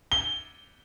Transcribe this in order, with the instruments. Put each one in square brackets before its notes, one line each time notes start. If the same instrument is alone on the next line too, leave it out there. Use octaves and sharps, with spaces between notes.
[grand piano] G7